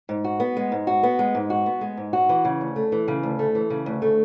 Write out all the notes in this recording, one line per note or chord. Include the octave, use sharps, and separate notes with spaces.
G#2
F#4
B3
G#3
G#2
F#4
B3
G#3
G#2
F#4
B3
G#3
G#2
F#4
E3
C#3
D2
A3
E3
C#3
D2
A3
E3
C#3
D2
A3